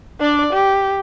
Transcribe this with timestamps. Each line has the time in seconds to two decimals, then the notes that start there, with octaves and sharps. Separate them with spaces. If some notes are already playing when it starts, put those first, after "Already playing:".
0.21 D4 D5
0.53 G4